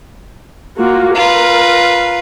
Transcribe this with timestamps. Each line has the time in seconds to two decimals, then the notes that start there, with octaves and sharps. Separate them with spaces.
0.77 A#3 F4 F#4
1.15 F4 A#4 B4